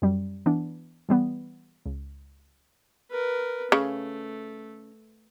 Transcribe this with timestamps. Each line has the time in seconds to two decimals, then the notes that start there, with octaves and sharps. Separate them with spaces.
0.02 F#2 G3
0.46 E3 B3 D4
1.09 E3 G3 B3
1.86 C#2
3.11 A#4 B4
3.72 C#3 A3